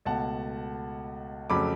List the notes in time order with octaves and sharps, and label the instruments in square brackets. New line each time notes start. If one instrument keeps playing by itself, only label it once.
[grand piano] C#2 B2 A3 F#5 A5
F2 C#3 F#3 A3 B5 D6